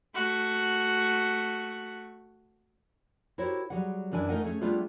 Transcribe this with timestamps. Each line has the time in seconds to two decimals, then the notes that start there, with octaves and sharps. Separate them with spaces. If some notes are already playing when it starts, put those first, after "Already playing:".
0.15 A3 F#4
3.38 E4 F#4 G4 A#4 C5 C#5
3.70 F#3 G3 G#4 F#5
4.11 F#2 E3 D4 D5 G#5
4.28 A3 D#4 A#4 D#5 F#5 G#5
4.43 A3 C#4 G#4 A4
4.61 G3 A3 B3 D4 F4 G#4